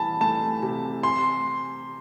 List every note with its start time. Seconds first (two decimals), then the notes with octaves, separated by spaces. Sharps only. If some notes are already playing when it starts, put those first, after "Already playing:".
Already playing: C2 E3 A5 B5
0.21 A3 A5
0.62 C3
1.03 C6